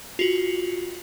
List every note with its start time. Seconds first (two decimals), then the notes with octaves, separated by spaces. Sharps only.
0.19 F4 F#4